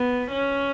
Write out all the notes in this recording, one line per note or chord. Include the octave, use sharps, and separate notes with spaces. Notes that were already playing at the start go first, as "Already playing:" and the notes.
Already playing: B3
C#4